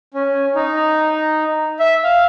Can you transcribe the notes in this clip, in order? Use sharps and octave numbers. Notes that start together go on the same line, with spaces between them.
C#4
D#4
E5
F5